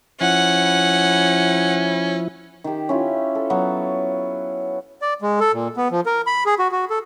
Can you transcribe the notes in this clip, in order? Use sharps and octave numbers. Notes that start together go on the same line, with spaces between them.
F3 C#4 E4 F#5
D#3 G4
C#4 E4 F4
A4
F#3 B3
D5
G#3
A4
A#2
B3
F3
A#4
B5
G#4
F#4
F#4
A4